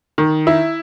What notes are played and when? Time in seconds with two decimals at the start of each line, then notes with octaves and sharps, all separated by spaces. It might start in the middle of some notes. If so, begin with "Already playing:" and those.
0.18 D#3
0.47 E4